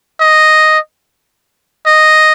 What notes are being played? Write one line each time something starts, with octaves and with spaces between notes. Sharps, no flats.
D#5
D#5